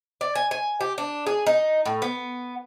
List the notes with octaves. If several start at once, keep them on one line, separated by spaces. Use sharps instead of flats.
D5
G#5
G#5
G4
D4
G#4
D#4
A2
B3